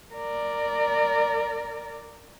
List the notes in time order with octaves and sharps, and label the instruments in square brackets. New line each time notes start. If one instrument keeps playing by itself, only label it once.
[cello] A#4 D5